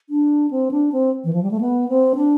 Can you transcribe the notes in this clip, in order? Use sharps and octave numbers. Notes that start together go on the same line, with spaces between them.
D4
C4
D4
C4
E3
F3
G3
A3
B3
C4
D4